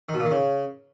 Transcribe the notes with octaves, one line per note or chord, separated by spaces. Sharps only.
D#3
B2
A#2
D#3
C#3